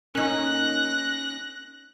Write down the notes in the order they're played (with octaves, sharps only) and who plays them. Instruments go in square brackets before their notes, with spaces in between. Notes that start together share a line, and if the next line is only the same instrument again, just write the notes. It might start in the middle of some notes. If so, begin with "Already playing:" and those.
[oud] A#3 D#4 [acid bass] C#4 [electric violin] F#6 A#6